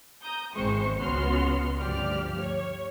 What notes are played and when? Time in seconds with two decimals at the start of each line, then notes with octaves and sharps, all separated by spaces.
0.23 A#5 D#6 G6
0.54 G#1 E2 G#3 C4 C5 C#6
1.00 C#2 B3 C#4 F#4 C6 F6
1.79 D2 G2 F3 G4 D5 F6
2.38 C#5